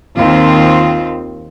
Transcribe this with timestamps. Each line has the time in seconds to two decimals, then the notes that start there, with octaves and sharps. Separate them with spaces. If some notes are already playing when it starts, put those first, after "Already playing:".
0.17 D#2 D#3 C4 F4